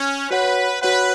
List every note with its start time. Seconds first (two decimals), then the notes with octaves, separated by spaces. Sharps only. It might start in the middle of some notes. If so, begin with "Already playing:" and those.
Already playing: C#4
0.30 F#4 B4 C#5 F#5
0.82 F#4 B4 C#5 F#5